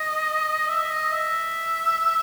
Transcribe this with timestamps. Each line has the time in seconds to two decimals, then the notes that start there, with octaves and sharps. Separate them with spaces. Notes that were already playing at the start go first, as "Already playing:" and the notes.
Already playing: D#5
0.68 E5
0.90 D#5
1.12 E5